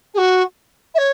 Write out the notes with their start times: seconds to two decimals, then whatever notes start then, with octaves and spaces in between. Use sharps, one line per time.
0.14 G#4
0.18 F#4
0.94 E5
0.98 C#5